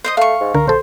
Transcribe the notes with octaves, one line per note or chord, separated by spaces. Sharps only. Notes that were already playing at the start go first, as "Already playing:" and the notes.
C5 D#5 D#6
A3 F5 C#6
G#2
C#2 D3 A#4
A#1 A4 C5